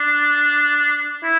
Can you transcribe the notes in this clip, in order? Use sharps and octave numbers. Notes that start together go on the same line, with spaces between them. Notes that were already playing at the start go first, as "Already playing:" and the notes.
Already playing: D4
E4